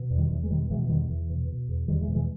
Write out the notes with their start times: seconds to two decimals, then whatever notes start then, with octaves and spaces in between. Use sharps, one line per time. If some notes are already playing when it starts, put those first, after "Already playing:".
Already playing: B2
0.10 E2
0.18 D#3 G3
0.31 E2 E3
0.44 G#3
0.50 B2 D#3 G3
0.70 B2 E3 G#3
0.82 E3
0.89 E2 D#3 G3
1.10 E2 E3
1.30 B2
1.49 B2
1.68 E2
1.88 E2 D#3 G3
2.01 E3 G#3
2.08 B2
2.15 E3 G#3